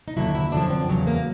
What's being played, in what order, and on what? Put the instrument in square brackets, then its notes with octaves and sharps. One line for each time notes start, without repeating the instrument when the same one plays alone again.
[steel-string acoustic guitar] D#4
D#2 D3 F#3 E4
E4
F#2 D3 F3 D4
C4
E2 C#3 F#3
A#3